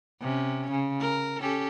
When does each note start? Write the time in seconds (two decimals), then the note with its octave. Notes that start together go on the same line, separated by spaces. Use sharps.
0.21 C3 C#4
0.71 C#3
1.01 A#4
1.40 C#4 G4 A4